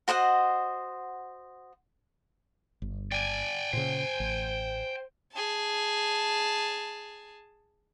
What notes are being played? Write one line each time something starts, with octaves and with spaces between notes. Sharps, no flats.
F#4 C5 D#5 F#5
G1
D5 G5 G#5
A#2 C#3 C5
A1
G#4 A5